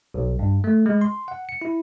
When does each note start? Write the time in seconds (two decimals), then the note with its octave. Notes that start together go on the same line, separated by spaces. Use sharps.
0.14 B1
0.39 G2
0.64 A3
0.86 G#3
1.01 C6
1.28 F#5
1.49 C#7
1.62 E4